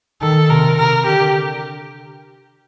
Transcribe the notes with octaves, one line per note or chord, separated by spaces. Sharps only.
D#3 A4
C3 A#4
C3 A#4
D3 G4